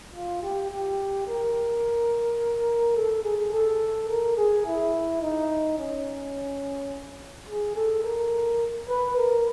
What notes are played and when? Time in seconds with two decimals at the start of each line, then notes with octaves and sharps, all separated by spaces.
0.14 F4
0.43 G4
0.70 G4
1.27 A#4
2.96 A4
3.24 G#4
3.52 A4
4.09 A#4
4.37 G#4
4.66 E4
5.21 D#4
5.79 C#4
7.48 G#4
7.75 A4
8.04 A#4
8.88 B4
9.16 A#4